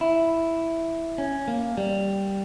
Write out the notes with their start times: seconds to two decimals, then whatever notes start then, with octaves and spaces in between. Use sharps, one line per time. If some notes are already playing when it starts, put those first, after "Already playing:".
0.01 E4
1.18 C#4
1.48 A#3
1.77 G3